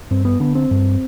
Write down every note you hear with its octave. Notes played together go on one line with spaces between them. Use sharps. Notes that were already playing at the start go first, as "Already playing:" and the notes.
G2 C4
B3
D3 B3
C4
G2